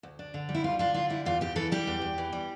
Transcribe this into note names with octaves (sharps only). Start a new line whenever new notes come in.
D2
D4
D3
G3
E4
D2 F4
D4 F4
D3 F4
G3 E4
E2 F4
E2 G4
E3 A4
G3 G4
E2
E2
E3
G3